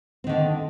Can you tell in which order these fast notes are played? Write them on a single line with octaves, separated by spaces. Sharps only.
C4 D#3 D3